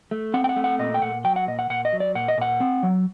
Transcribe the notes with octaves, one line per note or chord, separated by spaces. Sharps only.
A3
C4 F#5
G5
F#5
A3
F#5
A#2 D#5
G5
A#2 F#5
F#3 G5
F#5
A#2 D#5
F#5
A#2 F#5
D#5
F#3
D5
A#2 F#5
D#5
A#2 F#5
C4
F#3